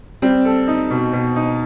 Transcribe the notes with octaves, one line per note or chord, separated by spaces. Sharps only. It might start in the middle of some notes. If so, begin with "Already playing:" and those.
G3 C4
A4
D#4
B2
B2
D#4